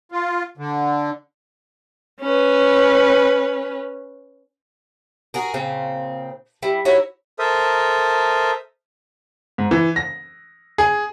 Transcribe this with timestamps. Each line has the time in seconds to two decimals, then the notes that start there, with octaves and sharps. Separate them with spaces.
0.12 F4
0.57 D3
2.21 C#4 B4
5.34 F#4 G#4 A#4
5.54 A#2 C#3 C4
6.63 G3 E4
6.85 D#4 E4 F#4 C#5
7.39 A4 A#4 C5 E5 D#6
9.58 G#2
9.71 E3
9.96 A#6
10.78 G#4